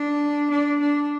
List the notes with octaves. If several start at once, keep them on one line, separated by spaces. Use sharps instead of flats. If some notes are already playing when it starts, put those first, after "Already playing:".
Already playing: D4
D4
D4